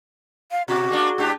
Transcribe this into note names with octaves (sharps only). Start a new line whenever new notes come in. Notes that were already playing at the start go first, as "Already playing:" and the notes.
F5
B2 F#4
G#3 A#3 D4
G#2 D4 G4